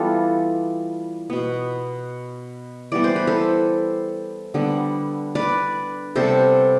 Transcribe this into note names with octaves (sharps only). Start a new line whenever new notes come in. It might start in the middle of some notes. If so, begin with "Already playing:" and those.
Already playing: E3 G3 B3 F4 A4
B2 B3
E3 G3 B3 D5
C5
B4
A4 C5
D3 G3 B3
B4 D5
C3 G3 B3 A4 C5